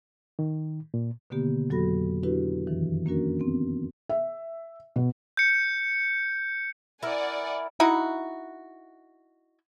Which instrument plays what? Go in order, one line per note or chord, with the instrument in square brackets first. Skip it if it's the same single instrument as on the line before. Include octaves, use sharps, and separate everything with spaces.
[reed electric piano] D#3
A#2
[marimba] B2 D3 D#3 A#3 B3 G4
F2 F#3 F#4 A4 B5 A#6
D4 E4 F#4 G4 B4
F#2 D#3 E3
A#3 C#4 D4 F#4 A#4
B3 C4
[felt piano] E5
B2
[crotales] G6 C#7
[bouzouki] E4 A#4 [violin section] D5 F#5 G#5
[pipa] D#4 E4 F#4